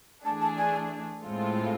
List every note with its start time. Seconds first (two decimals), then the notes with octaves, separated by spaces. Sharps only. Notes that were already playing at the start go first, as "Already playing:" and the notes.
0.25 E3 A3 D4 G#4 A5
0.42 A5
0.58 G#5
1.23 A2 G#3 C4 F4 A4